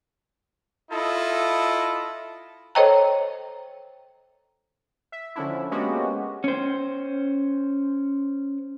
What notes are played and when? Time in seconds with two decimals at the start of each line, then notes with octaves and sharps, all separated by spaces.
0.91 E4 F4 A4 D#5
2.75 A4 C5 C#5 D#5 G5 A#5
5.12 E5
5.36 D3 F3 C#4 D4 E4
5.71 G#3 A#3 B3 C#4 F#4 G4
6.44 C#4 C5